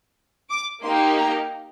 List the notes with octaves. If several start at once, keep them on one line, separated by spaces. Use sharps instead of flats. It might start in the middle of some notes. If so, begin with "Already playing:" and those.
D6
A#3 D#4 G4 C6
A#5